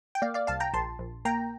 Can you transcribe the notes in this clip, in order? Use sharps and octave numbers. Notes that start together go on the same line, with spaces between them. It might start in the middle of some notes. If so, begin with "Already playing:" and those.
G5
A#3 D5 F5
D5 F5
C2 F5 A5
G5 A#5
A#1 A5 C6
A#1
A#3 G5 A#5